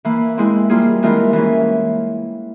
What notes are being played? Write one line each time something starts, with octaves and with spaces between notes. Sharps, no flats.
E3 A#3 E4
G#3 C4 E4
G3 A#3 F4 G#4
E3 G#3 C4 F4 A#4
E3 A#3 C#4